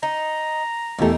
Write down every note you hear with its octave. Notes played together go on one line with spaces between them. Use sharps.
D#4 A#5
E1 E2 A3 A#3 D#4 E4 G4 A4